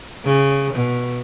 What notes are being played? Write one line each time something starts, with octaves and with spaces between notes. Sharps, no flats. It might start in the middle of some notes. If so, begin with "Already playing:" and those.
C#3
B2